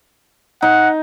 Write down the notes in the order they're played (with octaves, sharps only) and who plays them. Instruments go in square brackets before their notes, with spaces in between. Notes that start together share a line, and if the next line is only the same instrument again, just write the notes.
[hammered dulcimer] D#4 [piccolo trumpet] F#5